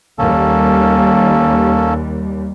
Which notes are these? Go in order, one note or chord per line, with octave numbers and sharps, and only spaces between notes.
D#2 G3 A#3 C#4 A4